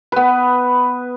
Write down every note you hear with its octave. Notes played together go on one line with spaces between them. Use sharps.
B3 B4